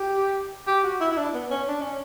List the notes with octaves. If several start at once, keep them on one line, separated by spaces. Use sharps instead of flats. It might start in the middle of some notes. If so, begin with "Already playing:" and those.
Already playing: G4
G4
F#4
E4
E4
D4
B3
C#4
D4
C#4